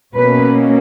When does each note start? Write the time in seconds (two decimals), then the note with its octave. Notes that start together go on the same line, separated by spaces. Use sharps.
0.15 B2 A#3 C#4 B4